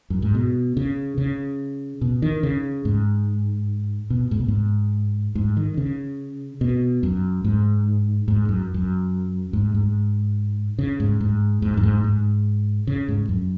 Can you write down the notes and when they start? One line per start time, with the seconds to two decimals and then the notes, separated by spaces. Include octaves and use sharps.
0.10 F#2
0.22 G#2
0.35 B2
0.77 C#3
1.18 C#3
2.01 B2
2.22 D#3
2.43 C#3
2.85 G#2
4.10 B2
4.31 G#2
4.40 B2
4.48 G#2
5.35 G#2
5.57 D#3
5.77 C#3
6.61 B2
7.03 F#2
7.44 G#2
8.28 G#2
8.49 F#2
8.74 F#2
9.53 G#2
9.74 G#2
10.79 C#3
11.00 G#2
11.20 G#2
11.62 G#2
11.77 F#2
11.83 G#2
12.04 G#2
12.87 C#3
13.08 G#2
13.29 F#2